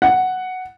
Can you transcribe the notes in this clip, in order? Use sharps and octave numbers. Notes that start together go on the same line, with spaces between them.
F#5